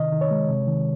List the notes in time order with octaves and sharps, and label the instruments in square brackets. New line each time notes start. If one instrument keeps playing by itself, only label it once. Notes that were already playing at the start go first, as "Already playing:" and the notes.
Already playing: [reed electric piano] C3 D#3 D#5
D#3
C#5
G#3
C3
D#3